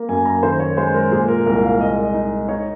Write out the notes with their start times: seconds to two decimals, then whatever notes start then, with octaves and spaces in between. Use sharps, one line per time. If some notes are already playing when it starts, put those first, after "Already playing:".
Already playing: A#3
0.09 F#2 G#5
0.25 A#5
0.43 D#3 C5
0.59 C#5
0.77 G#3 C5
0.94 A#4
1.11 A#2 G#4
1.28 A#4
1.46 C2 A#4
1.63 F5
1.80 G#3 D#5
2.03 D#5
2.14 D#4
2.48 D#4 C#5